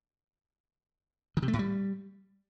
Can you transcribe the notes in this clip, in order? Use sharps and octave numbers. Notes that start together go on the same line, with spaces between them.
D#3
C3
A3
A2
G3